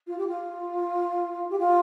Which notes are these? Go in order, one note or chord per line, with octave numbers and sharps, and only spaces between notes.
F4
G4
F4
G4
F4